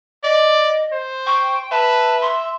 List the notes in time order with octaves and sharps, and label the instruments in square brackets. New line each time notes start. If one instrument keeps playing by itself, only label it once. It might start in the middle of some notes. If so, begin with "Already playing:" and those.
[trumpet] D5 [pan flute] D#5
[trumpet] C5
[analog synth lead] G5 [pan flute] C#6
[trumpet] B4 [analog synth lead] E5 [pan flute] A5
[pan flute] C6